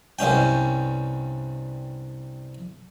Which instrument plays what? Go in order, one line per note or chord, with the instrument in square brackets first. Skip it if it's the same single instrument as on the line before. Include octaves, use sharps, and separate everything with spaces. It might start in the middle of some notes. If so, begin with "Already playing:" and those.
[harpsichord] C2 G2 C#4 G5